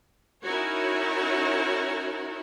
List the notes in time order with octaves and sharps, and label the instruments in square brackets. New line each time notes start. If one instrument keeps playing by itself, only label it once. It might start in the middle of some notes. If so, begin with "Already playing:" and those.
[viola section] C#4 D#4 E4 F#4 A#4 C#5